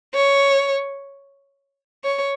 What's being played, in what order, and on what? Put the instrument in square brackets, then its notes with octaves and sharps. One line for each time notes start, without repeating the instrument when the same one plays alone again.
[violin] C#5
C#5